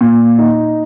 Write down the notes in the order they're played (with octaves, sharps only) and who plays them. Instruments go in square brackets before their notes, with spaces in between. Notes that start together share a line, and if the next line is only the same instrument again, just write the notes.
[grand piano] A#2
D#4